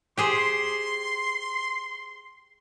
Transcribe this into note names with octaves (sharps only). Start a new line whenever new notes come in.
G4 G#4 C5 C6